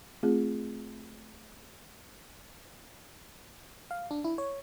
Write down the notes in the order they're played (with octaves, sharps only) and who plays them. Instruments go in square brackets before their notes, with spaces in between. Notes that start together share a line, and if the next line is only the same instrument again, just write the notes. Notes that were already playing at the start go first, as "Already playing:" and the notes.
[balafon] A3 C4 F4 G#4
[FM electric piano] F5
D4
E4
C#5